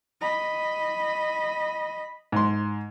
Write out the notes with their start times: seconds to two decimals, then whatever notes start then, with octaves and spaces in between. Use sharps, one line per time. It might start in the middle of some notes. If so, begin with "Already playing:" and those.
0.21 D#5 B5
2.32 G#2 C6